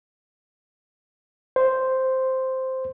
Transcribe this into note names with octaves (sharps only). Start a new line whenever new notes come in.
C5